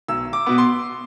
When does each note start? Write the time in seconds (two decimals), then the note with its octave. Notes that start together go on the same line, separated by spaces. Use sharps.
0.08 B1 E6
0.33 D6
0.46 B2 B3
0.58 C6